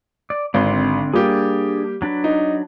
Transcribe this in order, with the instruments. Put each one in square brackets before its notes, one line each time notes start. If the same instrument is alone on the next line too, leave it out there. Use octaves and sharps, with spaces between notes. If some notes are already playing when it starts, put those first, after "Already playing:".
[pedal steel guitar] D5
[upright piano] G#1 [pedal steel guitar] D3 C4 C6
[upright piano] G3 A#3 G4 [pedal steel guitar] D4 G#4
[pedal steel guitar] F#3 D4 B4
[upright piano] D#4